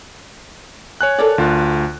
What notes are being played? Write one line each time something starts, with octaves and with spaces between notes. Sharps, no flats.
C#5 G#5 F#6
A4 A#4 D5
D2 F4